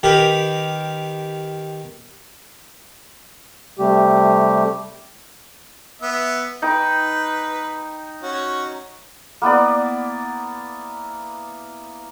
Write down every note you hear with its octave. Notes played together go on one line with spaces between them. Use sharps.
D#3 G4 A#4 B4
C3 G3 A3 G4
B3 E5
D#4 B4 G5
C#4 F#4
A#3 B3 E4 D5